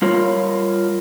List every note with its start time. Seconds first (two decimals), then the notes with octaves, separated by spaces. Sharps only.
0.02 G3 F4 A#4 C#5